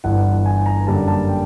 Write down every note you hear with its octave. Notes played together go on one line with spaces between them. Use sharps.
G1 G2 E3 F#5
G#5
A#5
F#2 D3 G3 A#3 A5
A5
G5